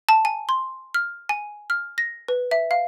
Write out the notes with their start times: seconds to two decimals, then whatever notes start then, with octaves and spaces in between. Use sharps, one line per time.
0.09 A5
0.25 G#5
0.49 C6
0.94 F6
1.29 G#5
1.70 F6
1.98 A#6
2.28 B4
2.51 E5
2.71 F5